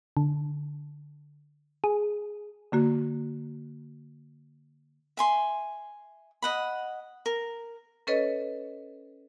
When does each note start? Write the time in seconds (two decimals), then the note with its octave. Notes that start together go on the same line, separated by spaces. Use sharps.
0.17 D3
1.84 G#4
2.72 D3 A#3 F#4
5.17 E5 G#5 C6
6.42 D#5 F#5 B5
7.26 A#4
8.07 C#4 A4 B4 C#5 D#5